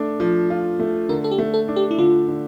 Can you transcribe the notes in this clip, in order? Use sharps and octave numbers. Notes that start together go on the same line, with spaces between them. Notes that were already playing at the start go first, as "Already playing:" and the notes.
Already playing: A3 D4
F3
F4
A3
D3 A#4
A4
G4
A3
A4
D4
G4
E4
D3 F4
D3